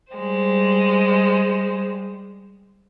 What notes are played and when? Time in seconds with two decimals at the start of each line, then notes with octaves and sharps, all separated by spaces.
0.13 G3 G#3 C5